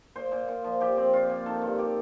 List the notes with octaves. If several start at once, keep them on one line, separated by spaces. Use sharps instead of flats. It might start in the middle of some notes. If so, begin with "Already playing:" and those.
A#2 C5
A#2
A#2
F3
F3 G4
C4
A#2 F4
A#2
D#3 A4
G2
G4